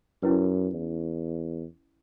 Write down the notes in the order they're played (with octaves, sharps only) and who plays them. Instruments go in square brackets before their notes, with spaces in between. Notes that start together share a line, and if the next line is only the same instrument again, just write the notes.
[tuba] F#2 [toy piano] C#4 E4 B4
[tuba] E2